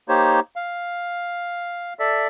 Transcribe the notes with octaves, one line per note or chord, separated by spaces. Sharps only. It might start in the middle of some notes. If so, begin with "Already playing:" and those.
A#3 D#4 G4 C5 C#5
F5
A4 D5 E5